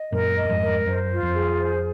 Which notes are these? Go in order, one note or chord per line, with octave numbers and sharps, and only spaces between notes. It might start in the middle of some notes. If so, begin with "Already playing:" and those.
Already playing: D#5
F#2 A#2 A#4
D#5
F#2
F2 G#2
A#4
F#2 C5
F4
F2
G#4
C5